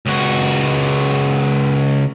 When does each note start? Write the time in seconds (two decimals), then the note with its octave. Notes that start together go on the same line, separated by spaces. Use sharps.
0.06 C#2 F#4